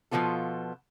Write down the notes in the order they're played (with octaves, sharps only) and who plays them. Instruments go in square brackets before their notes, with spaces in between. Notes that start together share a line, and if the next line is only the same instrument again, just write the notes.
[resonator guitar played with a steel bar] B2 F3 G3 B3 F4 A4